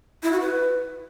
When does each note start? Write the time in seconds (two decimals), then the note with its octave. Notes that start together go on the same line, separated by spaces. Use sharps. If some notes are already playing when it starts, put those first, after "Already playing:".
0.23 E4
0.32 F#4
0.40 B4